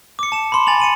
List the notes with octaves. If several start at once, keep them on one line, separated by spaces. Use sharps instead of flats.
D6 C#7
A5 E7
B5 C6
G#5 A6 F7 F#7
C#7 D#7 F#7